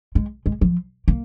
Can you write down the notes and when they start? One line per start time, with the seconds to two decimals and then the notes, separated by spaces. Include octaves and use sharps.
0.15 G#3
0.46 G#3
0.61 F3
1.08 A#3